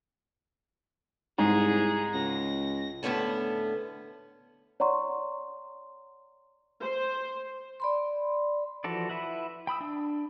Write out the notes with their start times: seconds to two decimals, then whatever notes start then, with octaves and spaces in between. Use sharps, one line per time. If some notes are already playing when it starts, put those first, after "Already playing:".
1.38 C2 G#2 G#4
2.14 C#2 A#6
3.03 A2 D3 B3 C#4 A5
4.80 C#5 D5 F#5 A#5 C6 C#6
6.83 C5
7.80 D5 B5 C6
8.84 E3 F3 F#4 A4 D5
9.09 E4 B4 E5 F#5
9.67 G5 B5 D#6 E6
9.81 D4